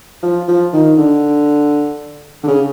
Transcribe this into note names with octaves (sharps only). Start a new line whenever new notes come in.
F3
F3
D#3
D3
D3
C#3